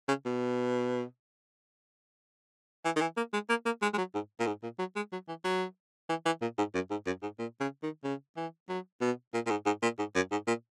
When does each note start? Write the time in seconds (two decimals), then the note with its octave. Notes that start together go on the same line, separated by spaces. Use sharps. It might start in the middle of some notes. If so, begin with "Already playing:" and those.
0.08 C#3
0.25 B2
2.85 E3
2.96 D#3
3.01 E3
3.17 A#3
3.33 G#3
3.49 A#3
3.66 A#3
3.82 G#3
3.93 G#3
3.98 F#3
4.14 G#2
4.40 A#2
4.47 G#2
4.63 A#2
4.79 F#3
4.96 G#3
5.12 F#3
5.28 E3
5.44 F#3
6.09 E3
6.26 E3
6.42 A#2
6.58 G#2
6.74 F#2
6.91 G#2
7.06 F#2
7.22 G#2
7.39 A#2
7.60 C#3
7.83 D#3
8.04 C#3
8.36 E3
8.69 F#3
9.01 B2
9.34 A#2
9.46 A#2
9.50 G#2
9.66 G#2
9.83 A#2
9.99 G#2
10.15 F#2
10.31 G#2
10.47 A#2